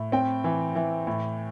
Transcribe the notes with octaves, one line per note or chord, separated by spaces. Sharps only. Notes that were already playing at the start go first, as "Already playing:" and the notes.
Already playing: A2
C4 G5
E3
E3
A2